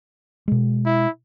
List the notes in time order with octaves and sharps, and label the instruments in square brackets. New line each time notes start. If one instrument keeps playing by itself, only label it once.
[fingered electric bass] B2 G#3
[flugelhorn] E4